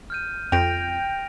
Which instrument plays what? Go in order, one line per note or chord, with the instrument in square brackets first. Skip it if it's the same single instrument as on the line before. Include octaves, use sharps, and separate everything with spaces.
[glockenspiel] F6 G6 D#7
[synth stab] F2 [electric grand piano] G5 [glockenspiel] A#6 D7 F7